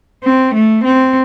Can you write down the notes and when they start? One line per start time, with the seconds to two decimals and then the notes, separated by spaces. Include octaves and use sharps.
0.24 C4
0.54 A3
0.85 C4